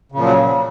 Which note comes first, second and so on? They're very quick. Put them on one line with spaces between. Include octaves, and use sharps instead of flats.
C#3 A#2 F3 F#3